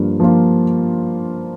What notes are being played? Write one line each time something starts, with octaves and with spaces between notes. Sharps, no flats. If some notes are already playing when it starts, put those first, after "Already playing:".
Already playing: G2 F3 A#3
F3 A#3 F4